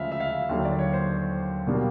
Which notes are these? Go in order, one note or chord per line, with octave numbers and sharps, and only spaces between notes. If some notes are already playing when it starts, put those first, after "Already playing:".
Already playing: D2 C#3 F3 G#3 E5 F5
E5
F5
D#2 D3 F#3
D5
C#5
C5
B2 G3 A#3 D4